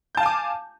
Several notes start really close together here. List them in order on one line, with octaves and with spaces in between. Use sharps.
G6 A5 F5 G#5 D6